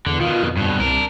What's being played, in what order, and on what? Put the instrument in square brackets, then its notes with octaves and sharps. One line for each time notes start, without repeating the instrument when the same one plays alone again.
[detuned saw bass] E2 [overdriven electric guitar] D3
[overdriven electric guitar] B2 D#3 [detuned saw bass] F4
[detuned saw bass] F2
[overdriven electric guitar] G2 B2
[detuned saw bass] C2 [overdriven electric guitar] D4 A#4